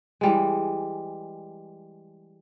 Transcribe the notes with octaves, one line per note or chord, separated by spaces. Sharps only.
E3 G3 G#3